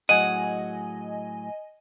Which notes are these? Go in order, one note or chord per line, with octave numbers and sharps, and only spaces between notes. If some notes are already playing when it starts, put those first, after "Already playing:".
A2 F#3 G#4 D#5 F#5 G#5 D#7